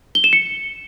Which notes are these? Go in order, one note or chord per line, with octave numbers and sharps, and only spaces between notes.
G7
E7
C#7